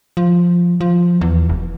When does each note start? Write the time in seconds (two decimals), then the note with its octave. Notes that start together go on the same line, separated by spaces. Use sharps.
0.17 F3
0.81 F3
1.21 E2
1.49 F1